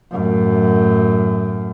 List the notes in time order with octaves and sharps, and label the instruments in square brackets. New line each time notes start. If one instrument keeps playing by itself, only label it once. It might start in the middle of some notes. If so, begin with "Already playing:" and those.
[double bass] F#2 A2